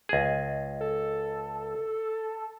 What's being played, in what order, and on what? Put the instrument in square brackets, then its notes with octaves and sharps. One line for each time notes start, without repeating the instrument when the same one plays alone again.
[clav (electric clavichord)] C#2 G#4
[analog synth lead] A4